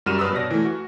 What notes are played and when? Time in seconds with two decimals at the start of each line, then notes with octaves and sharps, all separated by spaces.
0.06 F#2 G3 F#4 F6 D#7 E7
0.19 G2 B4 D#6 E6
0.32 B2 C#5 D5 A#6
0.51 E3 A3
0.65 F#4